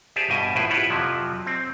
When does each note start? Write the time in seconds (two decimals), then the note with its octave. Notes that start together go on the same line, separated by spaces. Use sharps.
0.16 G4 G#4 C5 D5 E5 A5
0.30 G2 B2 D#5 E5 G#5
0.55 A#1 A2 E4 B4 C5 G5
0.70 E4 F4 G4 B4 E5 F#5
0.90 F2 C3 F3 F#3
1.47 C4